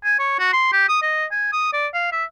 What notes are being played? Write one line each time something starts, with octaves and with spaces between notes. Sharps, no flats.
G#5
C#5
F#4
C6
G4
D#6
D#5
G#5
D#6
D5
F5
E5